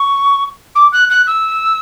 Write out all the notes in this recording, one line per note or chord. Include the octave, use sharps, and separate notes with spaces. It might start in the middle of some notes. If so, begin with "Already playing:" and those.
Already playing: C#6
D6
F#6
F#6
E6